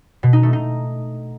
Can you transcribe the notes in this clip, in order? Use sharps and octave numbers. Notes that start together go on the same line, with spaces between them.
B2
D#4
A3
D#4